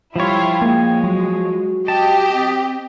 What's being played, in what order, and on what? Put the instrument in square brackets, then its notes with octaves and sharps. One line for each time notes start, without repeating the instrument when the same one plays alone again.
[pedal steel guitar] F3 C#5 [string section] G3 E4 F4 [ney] G5
[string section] G#3 [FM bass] A#3
[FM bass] F#3 [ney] F#4
[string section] G4 D#5 [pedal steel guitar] A5
[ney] C4